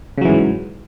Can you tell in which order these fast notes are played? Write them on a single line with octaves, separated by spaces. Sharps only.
C#3 F#3 E3 G#2